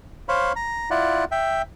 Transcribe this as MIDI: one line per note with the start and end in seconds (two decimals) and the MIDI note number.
0.29 0.52 72
0.29 0.52 73
0.29 0.52 77
0.29 0.52 83
0.56 0.90 82
0.91 1.25 64
0.91 1.25 65
0.91 1.25 74
0.91 1.25 78
1.32 1.62 76
1.32 1.62 79